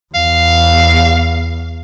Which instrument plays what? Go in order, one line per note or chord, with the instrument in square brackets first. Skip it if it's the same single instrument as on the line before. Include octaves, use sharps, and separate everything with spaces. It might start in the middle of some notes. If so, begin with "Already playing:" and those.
[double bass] E2 [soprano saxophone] F5